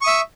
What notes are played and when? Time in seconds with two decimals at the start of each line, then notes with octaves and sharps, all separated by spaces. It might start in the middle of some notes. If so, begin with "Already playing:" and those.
0.01 C#6
0.04 D#6
0.07 E5